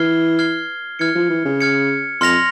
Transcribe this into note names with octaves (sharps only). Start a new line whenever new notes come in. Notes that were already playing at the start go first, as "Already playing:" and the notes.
Already playing: E3 F6 G#6 C7 G7
F6 G#6 C7 G7
E3 F6 G#6 C#7
F3
E3
C#3
F6 G#6 C#7
F2 C6 F6 A#6 F7